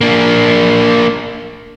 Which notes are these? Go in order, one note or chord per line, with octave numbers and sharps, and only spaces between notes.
A#3 D4